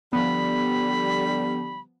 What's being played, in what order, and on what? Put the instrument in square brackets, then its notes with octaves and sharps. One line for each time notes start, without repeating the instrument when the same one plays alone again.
[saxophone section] D3 G3 [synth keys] F3 B3 [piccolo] B5